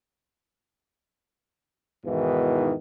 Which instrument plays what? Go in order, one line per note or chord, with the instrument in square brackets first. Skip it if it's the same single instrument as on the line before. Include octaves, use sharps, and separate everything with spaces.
[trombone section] E2 G#2 B2 D#3 E3